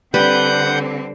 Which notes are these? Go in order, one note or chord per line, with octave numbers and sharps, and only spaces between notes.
D3 G3 C4 B4 F#5 G6